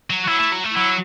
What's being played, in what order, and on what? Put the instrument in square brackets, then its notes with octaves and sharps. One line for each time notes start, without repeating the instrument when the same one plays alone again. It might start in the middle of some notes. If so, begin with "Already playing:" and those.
[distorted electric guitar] F#3
[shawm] F#4
[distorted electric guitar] F#3 [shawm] E4
[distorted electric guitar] A3
F#3
A3
[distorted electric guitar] F#3 [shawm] E4